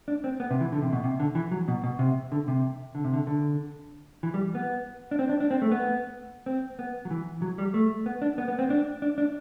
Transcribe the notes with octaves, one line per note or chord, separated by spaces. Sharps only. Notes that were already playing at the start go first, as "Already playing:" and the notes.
D4
C4
B3
C3
E3
D3
C3
B2
C3
D3
E3
F#3
B2
B2
C3
D3
C3
D3
C3
D3
D3
E3
G3
B3
D4
C4
D4
D4
C4
A3
B3
C4
B3
F#3
E3
F#3
G3
A3
B3
D4
B3
B3
C4
D4
D4
D4